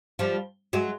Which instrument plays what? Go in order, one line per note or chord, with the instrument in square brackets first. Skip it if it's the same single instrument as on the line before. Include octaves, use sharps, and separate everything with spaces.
[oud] F3 G3
F#3 G#3